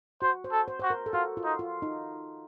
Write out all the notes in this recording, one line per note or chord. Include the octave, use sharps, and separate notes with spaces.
F#4 C5
C5
A4
C5
F#4 C5
A#4
A4
F4 F#4
F4
D#4
F4
D#4